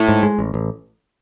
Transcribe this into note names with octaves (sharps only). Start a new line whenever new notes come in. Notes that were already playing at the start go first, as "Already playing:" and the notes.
Already playing: A2
G#2
G#3
A1
A1